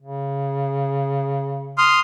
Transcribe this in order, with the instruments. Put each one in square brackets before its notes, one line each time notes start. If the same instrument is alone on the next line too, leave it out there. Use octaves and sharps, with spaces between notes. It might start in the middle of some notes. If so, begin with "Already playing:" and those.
[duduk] C#3
[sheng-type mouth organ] C6 D#6 F6